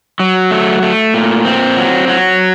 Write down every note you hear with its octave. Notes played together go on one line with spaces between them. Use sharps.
F#3
A3
A3
A#2
C4
F#3
F#3